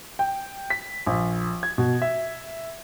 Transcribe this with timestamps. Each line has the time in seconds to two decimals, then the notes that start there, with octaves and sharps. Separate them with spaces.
0.19 G5
0.70 B6
1.06 A#1
1.63 G#6
1.78 B2
2.02 E5